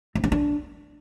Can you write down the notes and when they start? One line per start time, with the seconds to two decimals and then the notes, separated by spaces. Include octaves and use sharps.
0.15 C4
0.24 C#4
0.32 D4